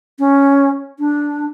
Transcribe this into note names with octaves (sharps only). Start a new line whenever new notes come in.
C#4
D4